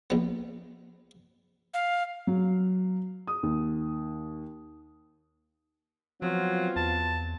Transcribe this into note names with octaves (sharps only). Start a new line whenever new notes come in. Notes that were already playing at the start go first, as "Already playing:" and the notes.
A#1 B3
F5
F#3
D#6
D#2
F3 F#3 B3 C4 F4
E2 A5